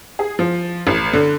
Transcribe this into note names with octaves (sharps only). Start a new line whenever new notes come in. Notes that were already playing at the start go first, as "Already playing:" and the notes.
G#4
F3
A1
D3